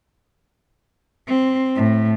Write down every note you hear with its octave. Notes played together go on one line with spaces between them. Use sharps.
C4
A2